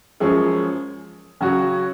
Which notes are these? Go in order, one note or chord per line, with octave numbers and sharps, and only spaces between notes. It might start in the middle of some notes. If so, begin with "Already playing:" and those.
F#2 F3 G#3 C#4 G#4
C#3 F#3 C#4 F#4